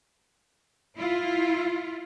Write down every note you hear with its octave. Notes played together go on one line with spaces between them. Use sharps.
E4 F4